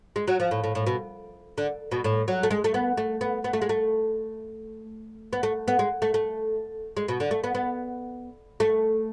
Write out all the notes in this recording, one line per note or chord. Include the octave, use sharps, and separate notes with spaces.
G#3
F#3
F3
A2
A2
A2
B2
D3
B2
A2
F#3
A3
G#3
A3
B3
A3
B3
B3
A3
G#3
A3
B3
A3
B3
G#3
A3
A3
G#3
B2
D3
A3
B3
B3
A3